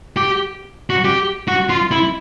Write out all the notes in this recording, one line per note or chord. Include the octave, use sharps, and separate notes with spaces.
G4
F#4
G4
F#4
F4
E4